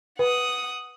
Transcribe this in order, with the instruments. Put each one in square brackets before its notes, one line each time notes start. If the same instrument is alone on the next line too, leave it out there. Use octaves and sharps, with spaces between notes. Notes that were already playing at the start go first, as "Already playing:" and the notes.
[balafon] B4 [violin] F#5 D#6